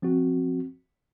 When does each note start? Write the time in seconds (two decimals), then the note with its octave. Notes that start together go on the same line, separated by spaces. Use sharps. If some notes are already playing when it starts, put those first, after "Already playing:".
0.02 F3 C4 F#4